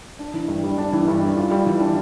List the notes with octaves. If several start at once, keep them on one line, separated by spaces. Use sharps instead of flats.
D4
E3
G2
G3
D4
E3
G2
G3
F4
G3
E3
D4